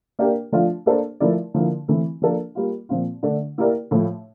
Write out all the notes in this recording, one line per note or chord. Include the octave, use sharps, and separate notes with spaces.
A#3 D4 G4 A#4
F3 A3 D4 F4
A#3 D4 A4 C5
F3 A3 E4 A#4 D5
D3 F3 A#3 E4
E3 A3 C4 E4
F3 A#3 D4 A4
G3 A#3 F4
A#2 F3 C4 F4
D3 A3 D4
A#3 E4 G4 A#4 D5
A2 F3 A3